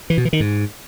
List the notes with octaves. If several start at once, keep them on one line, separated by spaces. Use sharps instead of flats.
E3
B2
E3
D#3
G#2